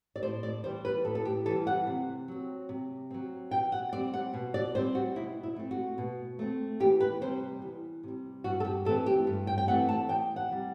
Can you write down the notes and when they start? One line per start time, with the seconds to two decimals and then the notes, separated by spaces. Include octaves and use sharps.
0.16 D5
0.23 A2 C5
0.43 D5
0.64 E3 G3 C5
0.85 B4
1.04 A2 A4
1.15 A4
1.25 G4
1.46 E3 G3 A4
1.67 F#5
1.87 C3
2.28 F#3 C4
2.69 C3
3.11 F#3 C4
3.51 B2 G5
3.72 F#5
3.93 G3 C4 D5
4.14 F#5
4.34 B2
4.54 D5
4.75 G3 C4 C5
4.95 F#4
5.16 B2 E4
5.43 E4
5.56 A3 C4
5.71 F#4
5.98 B2
6.39 A3 C4
6.80 E2 G4
7.00 B4
7.21 C3 G3 C5
7.62 E2
8.03 C3 G3
8.44 G2 F#4
8.60 A4
8.65 G4
8.85 E3 A3 C4 A4
9.06 G4
9.27 G2
9.47 G5
9.58 G5
9.67 E3 A3 C4 F#5
9.89 A5
10.09 E2 G5
10.36 F#5
10.50 C3 G3